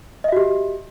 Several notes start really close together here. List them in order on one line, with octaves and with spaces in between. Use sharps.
D#5 E5 F#4 G4